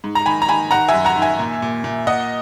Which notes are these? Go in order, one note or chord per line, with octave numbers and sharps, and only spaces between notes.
G#2
A#5
D#3 G#5 B5
A#5
D#3 G#5 B5
D#3 F#5 A#5
E5 G#5
F#2
F#5 A#5
D#3
E5 G#5
A#2
A#2
A#2
A#2 D#5 F#5